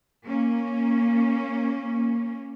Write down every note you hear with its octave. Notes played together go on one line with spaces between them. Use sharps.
A#3 C#4